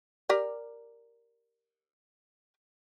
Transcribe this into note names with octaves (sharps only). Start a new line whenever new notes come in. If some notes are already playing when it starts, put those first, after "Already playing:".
G4 A#4 D5